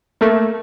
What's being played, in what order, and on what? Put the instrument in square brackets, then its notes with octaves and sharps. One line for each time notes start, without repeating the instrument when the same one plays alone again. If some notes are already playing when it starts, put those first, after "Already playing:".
[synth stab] A3 [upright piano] A#3